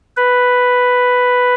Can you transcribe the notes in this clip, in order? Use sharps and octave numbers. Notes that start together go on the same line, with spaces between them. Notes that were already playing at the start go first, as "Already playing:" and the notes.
B4